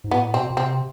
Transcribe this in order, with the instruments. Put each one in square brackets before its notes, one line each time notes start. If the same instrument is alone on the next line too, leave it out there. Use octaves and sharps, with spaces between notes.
[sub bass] G#2
[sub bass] A2 [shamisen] B3
[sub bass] B2 [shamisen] C4
[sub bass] B2
[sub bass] C3 [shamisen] C4